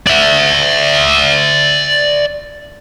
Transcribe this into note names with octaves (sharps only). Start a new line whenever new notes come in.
D5 E5